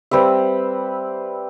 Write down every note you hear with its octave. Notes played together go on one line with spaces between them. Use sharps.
G3 C4 B4 E5